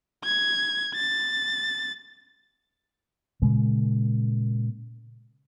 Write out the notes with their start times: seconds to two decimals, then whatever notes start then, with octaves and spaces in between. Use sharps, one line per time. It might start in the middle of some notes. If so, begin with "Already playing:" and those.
0.24 G#6
0.95 A6
3.42 A#2 C#3 G#3 A#3